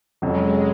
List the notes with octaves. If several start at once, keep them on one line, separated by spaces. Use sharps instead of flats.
F2 C3 F#3 G#3 C#4